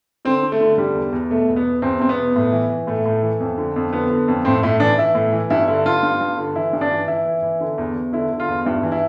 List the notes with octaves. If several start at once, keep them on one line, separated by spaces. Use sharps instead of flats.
D3 C4
D3
A3
D3
D3 G3
E2
E2
B2 A3
E2
B3
E2
E2 C4
E2 C4
B3
B2
A2
E3
E3
A2 A3
A2
E3
F2
D3
F2
D3 B3
D3
F2
A2 C4
A2 E4
E3 D4
E3 E4
A2
E3
G2 E4
D3 E4
G2 F4
G2
G2
D3
E3 E4
G2
D4
E3
E3 E4
E3
E3
D3
E2
E2
D3 E4
D3
F4
E2
G2 E4
E3
E4